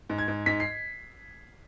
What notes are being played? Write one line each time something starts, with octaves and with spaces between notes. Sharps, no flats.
G#2
G#6
G#2
G#2 B6
C7